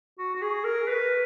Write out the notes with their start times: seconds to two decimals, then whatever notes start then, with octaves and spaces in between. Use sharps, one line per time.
0.19 F#4
0.35 F#4
0.42 G#4
0.64 A#4
0.88 B4